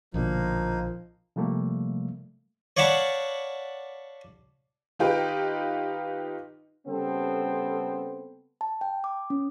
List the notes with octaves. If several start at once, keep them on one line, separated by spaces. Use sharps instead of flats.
A#1 B2 D3 F3 A#3 D#4
C3 F3 G3 A3 A#3
C#5 D5 F5 F#5 A5 B5
D#3 D#4 F4 G4 B4
C#3 G3 B3 C4 A4
A5
G5
D6
C#4